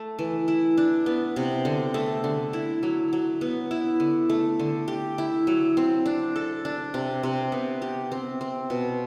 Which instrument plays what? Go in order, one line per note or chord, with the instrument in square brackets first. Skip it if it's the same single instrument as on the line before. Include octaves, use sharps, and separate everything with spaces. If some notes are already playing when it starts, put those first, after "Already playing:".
Already playing: [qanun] A3
E3
E4
D4
B3
C3
D3
A3
D3
E4
F#3
F#3
B3
E4
D3
A3
D3
G4
E4
F#3
C4
D4
A4
D4
C3
C3
B3
G4
C4
C4
B2